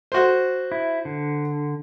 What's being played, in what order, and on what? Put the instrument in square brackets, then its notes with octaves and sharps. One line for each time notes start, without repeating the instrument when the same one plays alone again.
[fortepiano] F#4 C5
[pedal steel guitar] E4
D3